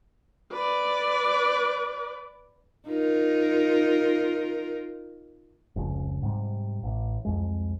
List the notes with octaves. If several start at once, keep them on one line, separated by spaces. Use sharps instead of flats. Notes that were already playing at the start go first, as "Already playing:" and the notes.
B4 D5
D#4 F4 A#4
F1 C#2 C#3
G#2 C3 G3
A1
C2 F2 G#3